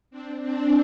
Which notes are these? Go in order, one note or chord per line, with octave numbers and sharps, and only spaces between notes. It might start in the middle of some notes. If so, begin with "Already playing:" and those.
C4 D4
C4 D4